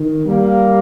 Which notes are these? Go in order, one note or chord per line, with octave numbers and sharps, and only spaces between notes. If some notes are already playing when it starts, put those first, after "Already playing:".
Already playing: D#3
G3 A#3